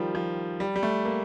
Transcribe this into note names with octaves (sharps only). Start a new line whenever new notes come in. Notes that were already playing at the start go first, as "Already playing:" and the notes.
Already playing: D#3 F3 G3
F3
G3
G3
A3
A#3